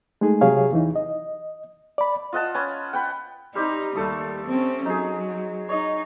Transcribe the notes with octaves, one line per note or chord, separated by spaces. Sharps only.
G#3 A3 D#4 G#4
C3 F#3 G4 G#4 C#5 F5
E2 E3 D#4
D#5
D5 B5
F4 D#5 F#5 A5
C#4 B4
F#5 G5 B5
G3 C4 D#4 G4
D#2 G3 A3 A4 D#6
C4 C#4
F#3 D#4 G#4
D#4 C#5 D#5